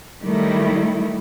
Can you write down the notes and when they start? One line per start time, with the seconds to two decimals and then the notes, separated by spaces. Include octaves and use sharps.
0.23 D#3 F#3 G3 A3 E4